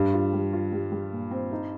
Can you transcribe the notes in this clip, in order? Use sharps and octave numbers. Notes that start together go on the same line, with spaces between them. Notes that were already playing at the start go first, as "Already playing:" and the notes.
Already playing: G2 G3
F4
G3
F4
G3
G3
A#2
C4
D#4